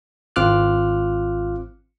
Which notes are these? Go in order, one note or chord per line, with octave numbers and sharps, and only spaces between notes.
G#1 C4 F4 D6 F6 F#6